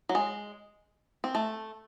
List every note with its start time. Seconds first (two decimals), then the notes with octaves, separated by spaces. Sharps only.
0.09 F#3
0.15 G#3
1.24 C4
1.35 A3